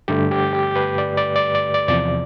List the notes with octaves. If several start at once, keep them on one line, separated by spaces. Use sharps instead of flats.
G2 D3 A3 G4
G4
G4
B4
D5
D5
D5
D5
D5
E2 C3 F3 D5